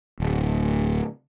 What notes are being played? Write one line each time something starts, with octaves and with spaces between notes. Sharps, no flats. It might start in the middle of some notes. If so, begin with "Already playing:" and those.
D1